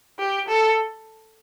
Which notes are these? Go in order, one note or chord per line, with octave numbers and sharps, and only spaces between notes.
G4
A4